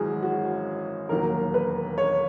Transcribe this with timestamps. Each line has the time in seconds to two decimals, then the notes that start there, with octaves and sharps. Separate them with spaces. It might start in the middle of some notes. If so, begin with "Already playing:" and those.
Already playing: G#1 F#2 E3 G#3 F#4 G#4
0.23 F#4
1.09 E1 D#2 D#3 F#3 A#4
1.54 B4
1.98 C#5